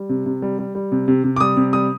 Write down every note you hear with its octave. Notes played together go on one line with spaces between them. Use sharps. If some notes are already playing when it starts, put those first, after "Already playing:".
Already playing: G3
C3
C3
G3
G3
G3
C3
C3
C3
D6
G3 D#6
C3
G3 D#6